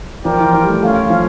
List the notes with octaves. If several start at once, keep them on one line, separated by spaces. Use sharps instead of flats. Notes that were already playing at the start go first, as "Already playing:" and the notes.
F3 F4 A#4 D5 G5
E3
F3
G3
A3
A3 C#4 F4 C#5 F5
F3